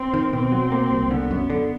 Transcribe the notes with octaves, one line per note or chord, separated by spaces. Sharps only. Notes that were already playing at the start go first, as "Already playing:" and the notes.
Already playing: C4
D#3
B2 C4
F#3
A#3
C2
D3 B3
F#2
D3